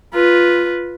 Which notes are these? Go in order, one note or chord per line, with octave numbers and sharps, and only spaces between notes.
F4 B4